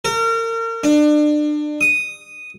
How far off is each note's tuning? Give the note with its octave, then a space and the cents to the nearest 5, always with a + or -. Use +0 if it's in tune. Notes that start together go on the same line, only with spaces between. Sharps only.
A#4 -35
D4 +30
D#6 -5